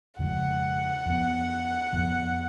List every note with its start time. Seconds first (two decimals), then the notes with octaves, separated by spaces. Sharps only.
0.19 F2 C#3 F3 G#3 F#5
1.06 F2 F3 B3
1.93 F2 F3 B3